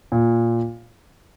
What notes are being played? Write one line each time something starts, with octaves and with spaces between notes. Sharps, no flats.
A#2